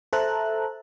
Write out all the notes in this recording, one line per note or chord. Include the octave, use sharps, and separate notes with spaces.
A4 C5 E5 A5 A#5 F#6